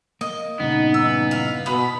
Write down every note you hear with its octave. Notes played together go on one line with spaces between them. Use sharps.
A#3 D#5
G2 A#2 C#3 B3 D#4
E3 D#4 E6
F5
B2 B3 B5